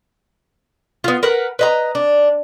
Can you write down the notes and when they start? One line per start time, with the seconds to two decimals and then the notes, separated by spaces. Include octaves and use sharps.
1.04 B3 F4
1.23 A#4 B4 F#5
1.59 B4 D#5 A#5
1.95 D4